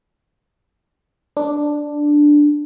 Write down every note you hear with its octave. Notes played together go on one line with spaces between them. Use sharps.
D4